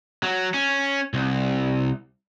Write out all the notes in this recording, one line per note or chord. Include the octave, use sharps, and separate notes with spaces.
F#3
C#4
C2